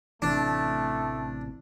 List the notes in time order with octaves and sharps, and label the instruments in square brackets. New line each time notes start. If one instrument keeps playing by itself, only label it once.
[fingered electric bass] A1 C3 E3 [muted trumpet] A3 [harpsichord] D4